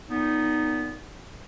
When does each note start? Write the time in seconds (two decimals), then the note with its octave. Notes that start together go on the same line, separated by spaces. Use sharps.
0.09 A#2 B3 D#4